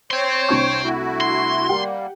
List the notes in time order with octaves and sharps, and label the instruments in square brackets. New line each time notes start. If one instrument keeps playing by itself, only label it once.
[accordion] C5 C#5 [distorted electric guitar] G5 C6
[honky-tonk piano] C2 D4 C#6
[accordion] A3 E4 F#4
[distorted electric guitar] C6
[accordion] G3 A#3 [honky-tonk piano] G4 F#5 G5